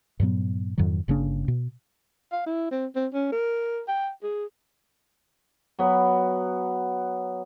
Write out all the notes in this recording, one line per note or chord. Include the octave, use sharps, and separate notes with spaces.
G2 A#2 F#3 B3
F2 G#2 D#3 F#3
G1 C#3 A#3 D4
B2
F5
E4
C4
C4
C#4
A#4
G5
G#4
F#3 B3